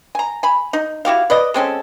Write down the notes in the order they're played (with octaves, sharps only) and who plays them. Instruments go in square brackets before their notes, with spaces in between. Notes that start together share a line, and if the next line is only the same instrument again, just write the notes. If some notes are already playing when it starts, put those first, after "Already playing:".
[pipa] G#5 A#5
G#5 B5
D#4
E4 F#4 G4 F5
B4 D5 D#5
G#3 C4 C#4 A4